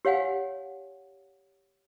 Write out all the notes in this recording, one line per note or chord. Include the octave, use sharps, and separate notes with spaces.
G4 C#5 F5 F#5 G#5